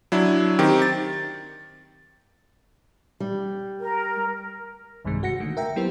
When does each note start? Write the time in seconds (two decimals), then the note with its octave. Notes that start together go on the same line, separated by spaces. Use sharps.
0.12 F#3 D4 E4
0.59 D#3 C4 G4
0.82 A6
3.20 G3
3.80 A#4
5.05 B1 G2 C3 D#3 G#3
5.22 G1 F#4 F#5 A#6 C#7
5.40 D3 D#3 A3 A#3
5.57 A#4 E5 G5
5.76 F#3 B3 E4 G4 A#4 C5